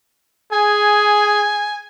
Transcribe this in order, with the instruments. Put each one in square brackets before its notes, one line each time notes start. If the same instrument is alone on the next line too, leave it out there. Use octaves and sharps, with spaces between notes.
[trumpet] G#4 [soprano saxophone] G#5